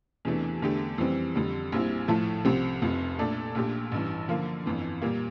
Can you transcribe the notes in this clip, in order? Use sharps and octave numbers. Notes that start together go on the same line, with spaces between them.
E2 C3 E3 A3 D4
E2 D3 A3 D4 G4
F2 E3 G3 C4
F2 D3 G3
A#1 A#2 G3 C4 E4
A2 F3 A3 E4 A4
C2 C3 F3 C4 G4
F1 F2 C3 F3
A#2 A3 D4 A4 D5
A#1 A#2 A3 D4 G4
A1 G2 E3
D3 F3 A#3 F4
G1 F2 E3
A#2 G3 A#3